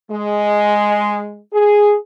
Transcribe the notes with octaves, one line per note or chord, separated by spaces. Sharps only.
G#3
G#4